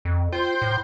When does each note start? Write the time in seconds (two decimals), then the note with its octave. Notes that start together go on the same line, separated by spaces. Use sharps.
0.05 F2
0.32 F4 C5 G5
0.62 A2